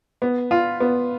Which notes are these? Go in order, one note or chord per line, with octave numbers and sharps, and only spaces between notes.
B3
F4
B3